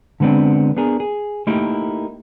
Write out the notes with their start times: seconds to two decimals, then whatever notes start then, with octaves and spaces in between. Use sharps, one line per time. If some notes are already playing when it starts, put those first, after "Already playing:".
0.20 D3 G#3 B3 C4 D4
0.77 B3 D4 G#4 A#4
1.00 G#4
1.47 A3 A#3 D#4 E4 G4 A#4